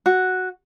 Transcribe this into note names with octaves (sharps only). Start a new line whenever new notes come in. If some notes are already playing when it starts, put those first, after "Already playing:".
F#4